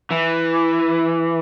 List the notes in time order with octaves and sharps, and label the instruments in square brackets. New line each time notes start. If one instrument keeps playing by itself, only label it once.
[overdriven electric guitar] E3